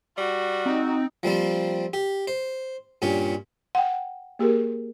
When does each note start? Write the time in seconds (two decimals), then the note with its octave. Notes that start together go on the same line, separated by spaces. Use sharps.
0.18 G3 F#4
0.66 C4 D#4
1.23 F3 G3 A#3 C4
1.93 G4
2.28 C5
3.02 G2 A#2 C#4 G4
3.75 F#5 G5
4.39 A#3 G4 G#4 A#4